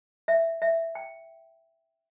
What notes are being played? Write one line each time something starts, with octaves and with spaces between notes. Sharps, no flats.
E5
E5
G5